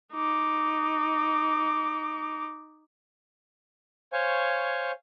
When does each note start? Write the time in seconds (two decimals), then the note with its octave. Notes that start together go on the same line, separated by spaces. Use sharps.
0.13 D#4 D6
4.13 C5 C#5 F5 G#5 C#6